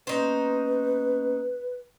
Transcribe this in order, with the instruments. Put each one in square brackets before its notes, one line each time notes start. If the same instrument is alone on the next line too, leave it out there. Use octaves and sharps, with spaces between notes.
[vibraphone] A#3 B3 C#4 [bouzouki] D#4 C5 [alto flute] B4